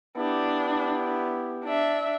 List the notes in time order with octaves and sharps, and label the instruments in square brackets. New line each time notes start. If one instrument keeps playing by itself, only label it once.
[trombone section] B3 E4 G4 [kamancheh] D4
[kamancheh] D4 E5